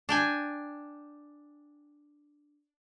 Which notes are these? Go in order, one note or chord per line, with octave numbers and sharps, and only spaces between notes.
D4 G5 G#5